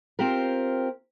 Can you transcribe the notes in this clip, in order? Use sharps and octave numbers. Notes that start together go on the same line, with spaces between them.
C4 F4 G4 A#4